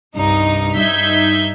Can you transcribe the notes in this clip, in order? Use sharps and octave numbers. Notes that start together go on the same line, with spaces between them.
C2 G2 D#4
G2 D#4 E5 G6 G#6 B6